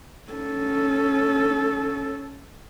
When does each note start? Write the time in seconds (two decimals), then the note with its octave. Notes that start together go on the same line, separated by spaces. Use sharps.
0.32 C#4 A4